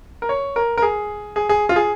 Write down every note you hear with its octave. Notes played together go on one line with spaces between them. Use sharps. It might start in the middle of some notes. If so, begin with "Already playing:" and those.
A#4
C#5
A#4
A#4
G#4
G#4
G#4
F4
G#4